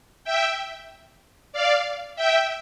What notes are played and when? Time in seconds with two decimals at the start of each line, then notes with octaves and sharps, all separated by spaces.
0.24 E5 G5
1.53 D5 F5
2.16 E5 G5